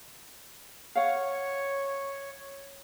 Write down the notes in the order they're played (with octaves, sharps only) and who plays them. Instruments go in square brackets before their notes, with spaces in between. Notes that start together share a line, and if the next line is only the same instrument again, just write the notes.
[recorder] C#5 [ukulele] F5 F#5